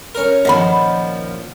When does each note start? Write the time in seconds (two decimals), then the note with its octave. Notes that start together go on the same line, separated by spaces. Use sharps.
0.15 C#4 A#4
0.45 A#2 D#3 F3 D#5 F#5 B5